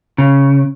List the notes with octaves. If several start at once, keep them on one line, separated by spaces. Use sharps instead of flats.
C#3